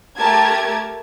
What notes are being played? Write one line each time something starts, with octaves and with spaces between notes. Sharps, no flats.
A3 G4 A#4 A5 G#6